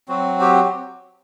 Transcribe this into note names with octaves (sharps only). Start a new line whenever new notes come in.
F#3 C4 F#4
G4